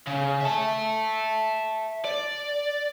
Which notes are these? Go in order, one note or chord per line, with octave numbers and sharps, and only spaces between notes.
C#3
E5 A5
D5